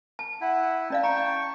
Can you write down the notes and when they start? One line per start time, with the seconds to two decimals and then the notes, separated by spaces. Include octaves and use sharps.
0.19 A5
0.41 E4 F#5
0.90 C#4 D5 F5 A5
1.03 G5 A#5 C#6